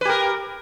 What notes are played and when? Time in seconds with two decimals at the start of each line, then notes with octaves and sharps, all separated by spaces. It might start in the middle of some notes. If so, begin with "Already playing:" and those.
0.01 B4
0.05 G4
0.09 A#4